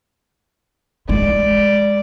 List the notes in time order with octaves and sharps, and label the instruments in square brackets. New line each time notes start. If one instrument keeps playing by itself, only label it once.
[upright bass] G#3 [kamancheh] D5